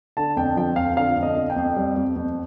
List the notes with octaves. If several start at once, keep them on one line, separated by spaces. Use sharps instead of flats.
D3 A5
F2 G5
F3 G5
F2 F5
D3 F5
F2
D#5
F2
G5
F2
G3
F2
F2